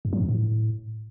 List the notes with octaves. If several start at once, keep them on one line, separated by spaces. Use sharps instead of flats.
G2
F#3
F#2
A2